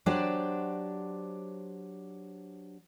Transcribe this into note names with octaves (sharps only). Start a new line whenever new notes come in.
F#3 D4 G4 C5 D5